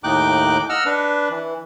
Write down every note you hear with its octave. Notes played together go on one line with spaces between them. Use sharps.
D#2 A2 D#4 G5 D6 F#6
D#5 F#5 E6 F6
D4 B4
E3